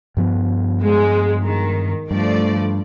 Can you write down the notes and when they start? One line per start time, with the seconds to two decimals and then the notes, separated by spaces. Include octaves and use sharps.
0.17 G2 F3 B3
0.82 G#3
1.43 D#3
2.11 G2 F3 A3 D5